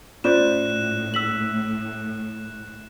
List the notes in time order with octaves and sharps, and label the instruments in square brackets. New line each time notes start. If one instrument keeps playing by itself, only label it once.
[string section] A2 [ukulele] C#4 C5 D5 [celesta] F4 [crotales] F#6 E7
[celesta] E6 B6 F#7